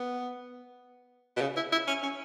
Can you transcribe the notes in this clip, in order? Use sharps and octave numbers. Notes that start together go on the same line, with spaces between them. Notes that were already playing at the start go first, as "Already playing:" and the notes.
Already playing: B3
B2
C#3
E4
E4
C#4
C#4